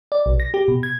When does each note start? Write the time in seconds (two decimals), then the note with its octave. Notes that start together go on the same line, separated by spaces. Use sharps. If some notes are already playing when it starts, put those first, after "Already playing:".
0.12 D5
0.26 B1
0.40 A#6
0.54 G4
0.68 B2
0.83 G#6